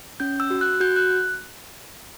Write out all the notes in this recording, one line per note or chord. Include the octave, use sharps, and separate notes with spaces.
C#4 G6
E6
F#4
F#6
F#4 G6
F#6